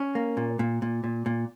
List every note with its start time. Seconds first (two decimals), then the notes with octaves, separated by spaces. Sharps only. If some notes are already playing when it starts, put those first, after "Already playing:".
Already playing: C#4
0.15 A#3
0.37 A#2
0.59 A#2
0.82 A#2
1.04 A#2
1.26 A#2